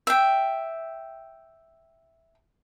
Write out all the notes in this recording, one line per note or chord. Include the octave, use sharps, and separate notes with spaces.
E5 G5